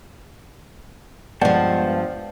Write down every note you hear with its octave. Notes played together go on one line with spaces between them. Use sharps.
G2 F3 G#3 B3 D5 F#5 G5 A5